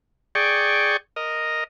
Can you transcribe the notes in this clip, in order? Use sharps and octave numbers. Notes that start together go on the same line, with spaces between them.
G#4 D5 G5 C#6
A#4 D#5